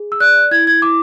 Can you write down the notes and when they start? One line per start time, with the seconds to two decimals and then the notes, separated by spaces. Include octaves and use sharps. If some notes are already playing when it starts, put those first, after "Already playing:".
Already playing: G#4
0.12 E6
0.20 D5 F#6
0.51 E4 G#6
0.67 G#6
0.82 E4 D6